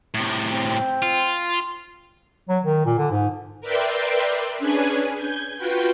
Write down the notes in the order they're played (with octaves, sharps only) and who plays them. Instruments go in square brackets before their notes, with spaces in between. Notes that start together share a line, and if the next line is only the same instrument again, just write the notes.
[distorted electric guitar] A2 C3
[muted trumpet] C4
[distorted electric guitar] F4
[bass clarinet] F#3
D#3
A#2
D3
G#2
[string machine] A#4 B4 D5 E5 G5 C6
C#4 D4 G#4 B4 G#5
G6 G#6
F4 F#4 B4 G5